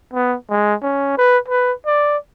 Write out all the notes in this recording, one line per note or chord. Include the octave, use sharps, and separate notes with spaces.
B3
G#3
C#4
B4
B4
D5